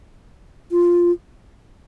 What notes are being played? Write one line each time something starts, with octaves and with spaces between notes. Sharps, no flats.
F4